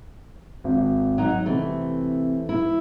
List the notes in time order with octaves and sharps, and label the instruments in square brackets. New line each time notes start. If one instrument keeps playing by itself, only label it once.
[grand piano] G#1
[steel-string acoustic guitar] F#3 D#4
[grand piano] C3 C4 [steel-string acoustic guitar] E3 A3
[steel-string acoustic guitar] E4